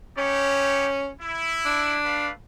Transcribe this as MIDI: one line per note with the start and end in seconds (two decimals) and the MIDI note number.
0.17 1.10 61
0.17 0.87 63
0.17 0.87 67
0.17 0.87 73
1.21 1.97 64
1.66 2.27 62
2.05 2.32 57
2.05 2.32 71
2.05 2.32 77